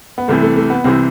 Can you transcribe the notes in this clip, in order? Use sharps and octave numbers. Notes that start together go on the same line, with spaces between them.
B3
C2 C3 E3 A3
A3
A3
B3
C2 C3 E3 C4